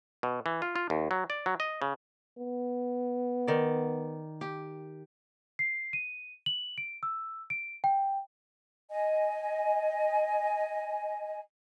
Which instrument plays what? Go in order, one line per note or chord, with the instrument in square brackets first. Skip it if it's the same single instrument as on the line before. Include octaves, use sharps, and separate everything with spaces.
[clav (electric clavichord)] B2
E3
F4
F4
D#2
F#3
D5
F#3
D#5
C#3
[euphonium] B3
[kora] D#3 D5
G4
[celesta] C7
D#7
F#7
D7
E6
D7
G5
[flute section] D#5 G#5